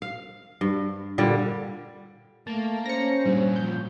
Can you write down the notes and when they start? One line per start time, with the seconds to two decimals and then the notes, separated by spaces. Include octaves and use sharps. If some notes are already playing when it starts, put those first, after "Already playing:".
0.02 F5
0.61 G2
1.18 A#2 D3 G3
2.47 A3 A#3 A5
2.86 C#4 C5 A#6 C#7
3.26 G2 A#2 F#3
3.56 F3 G6